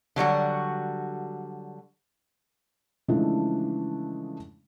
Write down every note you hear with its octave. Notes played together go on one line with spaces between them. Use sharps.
D3 F#3 G3 F#4
C#3 E3 F3 G#3 A3 D4